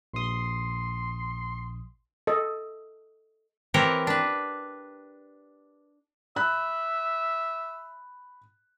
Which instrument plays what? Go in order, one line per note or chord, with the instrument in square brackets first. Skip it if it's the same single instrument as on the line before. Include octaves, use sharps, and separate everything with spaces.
[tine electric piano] A#1 D#6 [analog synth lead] C6
[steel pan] A4 D#5
[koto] E3 C4 G4 A#4 C#5
D4 B4
[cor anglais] E5 [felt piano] B5 F#6